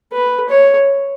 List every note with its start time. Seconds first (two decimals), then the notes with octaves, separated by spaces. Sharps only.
0.13 B4
0.49 C#5